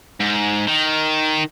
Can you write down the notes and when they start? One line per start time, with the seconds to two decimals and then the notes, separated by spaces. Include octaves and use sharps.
0.20 G#2
0.67 D#3